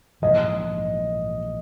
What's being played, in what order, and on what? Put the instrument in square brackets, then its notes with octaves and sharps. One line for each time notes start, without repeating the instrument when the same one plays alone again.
[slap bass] A#1 G#2 E3 [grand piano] D#5